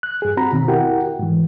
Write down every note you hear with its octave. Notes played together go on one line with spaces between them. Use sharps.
F#6
G2 G#4
C4 F#4 A#5 B5
B2 D#3 C4
E4 F#4 G4 A#4 F#5 G5
G#2 E3